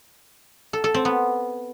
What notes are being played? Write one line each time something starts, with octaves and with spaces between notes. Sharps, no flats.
A4
A4
C4
B3